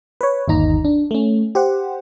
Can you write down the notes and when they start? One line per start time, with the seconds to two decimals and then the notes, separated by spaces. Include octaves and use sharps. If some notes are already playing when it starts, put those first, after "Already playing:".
0.21 B4 C#5
0.48 G1 D#2 D#4 A#5
0.85 D4
1.11 A3 C#4
1.55 G4 C5 F#5